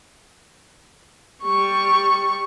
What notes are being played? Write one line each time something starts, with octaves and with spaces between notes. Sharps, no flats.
G3 C#6